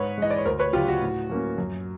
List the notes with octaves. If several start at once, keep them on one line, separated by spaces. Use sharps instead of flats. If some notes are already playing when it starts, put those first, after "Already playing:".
Already playing: G#2 B4 C#5
E3 G#3 D#5
D5
C#5
D2 A#4 C5
B4 C#5
C#3 F#3 F4 G4
F#4
A2
F#3 A#3 C#4
F#2